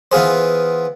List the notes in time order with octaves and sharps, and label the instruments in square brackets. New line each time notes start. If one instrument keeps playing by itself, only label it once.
[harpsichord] E3 B3 F4 G#4 C5